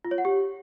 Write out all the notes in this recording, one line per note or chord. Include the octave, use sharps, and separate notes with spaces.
F4
C#5
F#5
G4